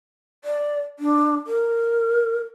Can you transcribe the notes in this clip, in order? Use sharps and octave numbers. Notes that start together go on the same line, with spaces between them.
D5
D4
A#4